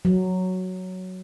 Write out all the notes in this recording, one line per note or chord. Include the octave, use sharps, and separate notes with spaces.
F#3